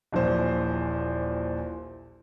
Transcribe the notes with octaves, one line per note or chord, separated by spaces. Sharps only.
D#1 A#1 E3 C5